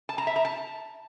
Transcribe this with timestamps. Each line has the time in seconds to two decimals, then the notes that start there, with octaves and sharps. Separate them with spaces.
0.09 A5
0.18 A#5
0.27 E5
0.36 A#5
0.45 A5